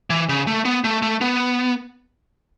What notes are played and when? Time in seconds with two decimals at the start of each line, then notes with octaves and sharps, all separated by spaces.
0.10 E3
0.29 C#3
0.47 A3
0.65 B3
0.84 A3
1.02 A3
1.21 B3